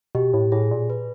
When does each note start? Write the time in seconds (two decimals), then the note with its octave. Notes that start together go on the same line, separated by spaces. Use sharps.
0.15 B2 G4
0.34 A2
0.52 A2 G#4
0.71 A#2
0.90 B4